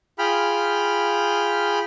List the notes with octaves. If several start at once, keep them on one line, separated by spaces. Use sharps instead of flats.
F4 G#4 G5 B5 F6